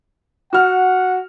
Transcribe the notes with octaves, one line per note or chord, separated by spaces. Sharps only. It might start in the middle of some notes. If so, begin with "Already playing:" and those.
F#4 F#5 F6